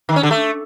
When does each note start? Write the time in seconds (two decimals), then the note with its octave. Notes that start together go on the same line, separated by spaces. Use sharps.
0.09 D#3
0.16 C#4
0.23 D3
0.31 A3